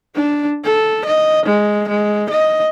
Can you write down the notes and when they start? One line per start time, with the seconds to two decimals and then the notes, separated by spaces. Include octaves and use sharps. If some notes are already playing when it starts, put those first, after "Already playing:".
0.15 D4
0.64 A4
1.05 D#5
1.46 G#3
1.88 G#3
2.30 D#5